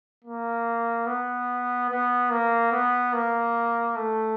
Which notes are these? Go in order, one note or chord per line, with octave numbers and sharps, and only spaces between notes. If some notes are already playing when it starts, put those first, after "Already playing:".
A#3
B3
B3
A#3
B3
A#3
A3